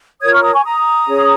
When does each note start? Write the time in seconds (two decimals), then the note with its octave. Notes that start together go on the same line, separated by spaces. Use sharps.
0.21 F4 A#4 C#5 D#6 G#6
0.32 C#6 F6
0.43 A#5 D#6
0.54 G#5 C#6
0.64 A#5 D#6
1.07 C#4 G#4 C#5